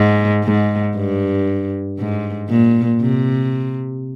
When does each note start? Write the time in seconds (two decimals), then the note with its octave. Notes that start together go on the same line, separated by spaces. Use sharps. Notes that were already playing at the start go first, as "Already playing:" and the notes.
Already playing: G#2
0.44 G#2
0.96 G2
1.99 G#2
2.49 A#2
3.01 C3